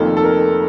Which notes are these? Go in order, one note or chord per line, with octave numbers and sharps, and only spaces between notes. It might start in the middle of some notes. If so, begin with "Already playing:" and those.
Already playing: F1 F2 D#3 A#3 D#4 A4
A4
A#4